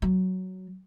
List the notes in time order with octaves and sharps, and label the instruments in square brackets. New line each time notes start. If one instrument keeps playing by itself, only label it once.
[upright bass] F#3